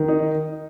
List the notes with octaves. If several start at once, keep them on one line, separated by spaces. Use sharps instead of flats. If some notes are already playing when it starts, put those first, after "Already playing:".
Already playing: D#3
D#4